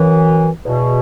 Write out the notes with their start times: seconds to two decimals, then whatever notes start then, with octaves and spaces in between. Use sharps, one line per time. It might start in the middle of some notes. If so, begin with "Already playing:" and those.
Already playing: F#2 E3
0.65 E2 B2